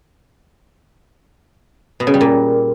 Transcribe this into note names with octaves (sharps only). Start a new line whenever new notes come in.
B2
C#3
G3
A#2